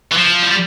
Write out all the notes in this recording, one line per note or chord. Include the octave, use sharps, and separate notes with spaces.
E3
F3
G3